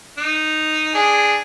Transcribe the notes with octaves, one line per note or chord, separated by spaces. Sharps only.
D#4
D4 G#4